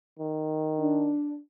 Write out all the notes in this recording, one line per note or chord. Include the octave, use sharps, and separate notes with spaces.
D#3
D4